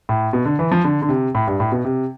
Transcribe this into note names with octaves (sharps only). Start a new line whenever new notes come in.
A2
B2
D3
E3
F3
D3
D3
C3
A2
G2
A2
B2
C3